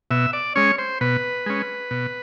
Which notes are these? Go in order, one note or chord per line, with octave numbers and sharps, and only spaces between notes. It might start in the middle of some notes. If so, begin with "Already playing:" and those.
B2 E5
D5
G#3 C#4 C#5
C5
B2 B4
G#3 C#4
B2